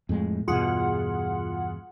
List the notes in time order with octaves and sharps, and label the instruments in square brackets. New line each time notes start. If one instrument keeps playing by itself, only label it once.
[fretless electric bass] F2 A2 G#3
[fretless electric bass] E2 G2 B2 [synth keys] F4 G#4 F#5